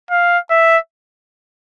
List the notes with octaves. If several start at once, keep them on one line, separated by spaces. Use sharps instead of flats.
F5
E5